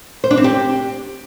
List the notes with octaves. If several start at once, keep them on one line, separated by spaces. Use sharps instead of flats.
C5
D4
C4
G4